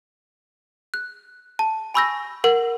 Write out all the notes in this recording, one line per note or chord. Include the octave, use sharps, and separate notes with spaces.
F#6
A5
G#5 B5 C#6 E6 G6 A#6
A#4 F#5